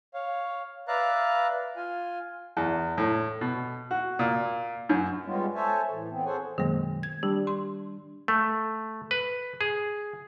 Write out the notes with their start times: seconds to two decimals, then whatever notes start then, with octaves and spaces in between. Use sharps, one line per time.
0.14 C#5 F5
0.88 B4 D5 E5 F5 A#5 F#6
1.76 F4 G#5
2.57 E2
2.98 A2
3.41 B2
3.91 F#4
4.19 A#2
4.89 F#2
5.25 G3 G#3 B3 C#4 F4
5.55 A4 C5 C#5 E5 G#5 A5
5.91 A2 E3
6.11 E3 B3 C4
6.25 G#4 A4 C5 C#5 F#5 G#5
6.58 F#2 B2 D#3 G#3 A#3
7.03 G#6
7.23 G3 D4 G4
7.47 C6
8.28 A3
9.11 B4
9.61 G#4